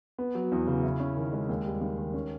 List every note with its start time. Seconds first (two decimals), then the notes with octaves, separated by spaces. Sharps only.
0.18 B3
0.35 F#3
0.52 E2
0.67 C#3
0.83 E4
1.00 C#4
1.17 D#3
1.33 G#3
1.49 D#2
1.66 G3
1.81 D#2
1.98 D#3
2.14 C#4